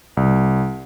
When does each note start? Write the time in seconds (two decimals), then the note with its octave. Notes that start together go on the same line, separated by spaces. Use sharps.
0.17 C2